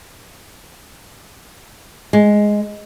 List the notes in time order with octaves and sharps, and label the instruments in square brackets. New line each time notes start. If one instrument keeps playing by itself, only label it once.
[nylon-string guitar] G#3